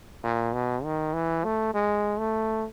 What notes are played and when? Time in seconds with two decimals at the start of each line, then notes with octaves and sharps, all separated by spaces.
0.24 A#2
0.53 B2
0.84 D#3
1.13 E3
1.44 A3
1.74 G#3
2.19 A3